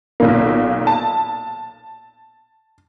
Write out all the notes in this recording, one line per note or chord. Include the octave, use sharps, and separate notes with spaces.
B1 A#2 A#3
A5